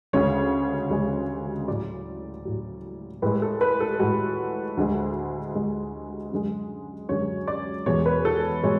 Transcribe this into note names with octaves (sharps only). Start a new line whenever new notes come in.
D2 C#3 G#3 C#5
D2 C#3 G#3
A2 F#3 D5
A2 F#3
A2 G#3 B4
A4
B4
A4
A2 G#3 F#4
D2 D3 G#3
D2 D3 G#3
F#2 D3 G#3
F#2 D3 G#3 C#5
D5
E2 B2 G#3 C#5
B4
A4
B2 G#3 C#5